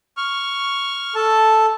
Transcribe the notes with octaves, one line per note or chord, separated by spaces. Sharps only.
C#6 F6
A4 A5